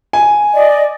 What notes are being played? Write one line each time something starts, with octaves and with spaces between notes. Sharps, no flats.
G#5
D5 D#5